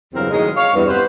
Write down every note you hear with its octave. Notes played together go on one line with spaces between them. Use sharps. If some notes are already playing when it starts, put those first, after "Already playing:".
E2 G2 C#3 F#3 C4 A#4
A2 D#3 F#3 G#3
C#5 F5
E2 G2
C3 B3 B4 C5